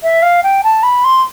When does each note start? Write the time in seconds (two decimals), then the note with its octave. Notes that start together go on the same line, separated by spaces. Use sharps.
0.03 E5
0.22 F5
0.43 G5
0.64 A5
0.83 B5
1.04 C6